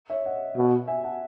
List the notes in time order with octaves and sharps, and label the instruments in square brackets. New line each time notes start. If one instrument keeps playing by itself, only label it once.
[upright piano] C#5 E5
D#5 F#5
[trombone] B2
[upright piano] E5 G#5
F#5 A5